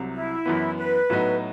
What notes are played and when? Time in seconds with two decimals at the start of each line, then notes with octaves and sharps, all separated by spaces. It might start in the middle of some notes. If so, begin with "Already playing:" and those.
Already playing: C2 C3 F#3
0.13 E4
0.46 F#2 E3 B3
0.78 B4
1.10 A2 F#3 B3 D#4 F#4